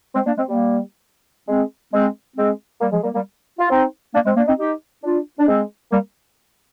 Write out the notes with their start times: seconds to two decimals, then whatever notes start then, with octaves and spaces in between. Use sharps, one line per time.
0.14 G#3 C4
0.26 A#3 D4
0.37 G#3 C4
0.48 G3 A#3
1.48 G#3 C4
1.93 G#3 C4
2.36 G#3 C4
2.81 G3 A#3
2.92 F3 G#3
3.03 G3 A#3
3.14 G3 A#3
3.59 F4
3.70 C4 D#4
4.14 A#3 D4
4.25 G#3 C4
4.36 A#3 D4
4.47 C4 D#4
4.59 D#4 G4
5.04 D4 F4
5.39 D4
5.48 G#3 C4
5.92 G3 A#3